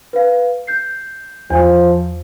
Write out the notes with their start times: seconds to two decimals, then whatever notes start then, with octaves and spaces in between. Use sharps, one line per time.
0.13 B4 F5
0.67 G6 C7
1.50 E2 F3